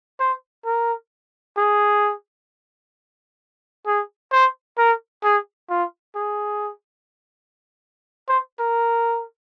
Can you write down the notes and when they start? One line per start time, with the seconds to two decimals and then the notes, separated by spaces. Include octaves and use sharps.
0.19 C5
0.65 A#4
1.57 G#4
3.87 G#4
4.32 C5
4.78 A#4
5.24 G#4
5.70 F4
6.15 G#4
8.29 C5
8.59 A#4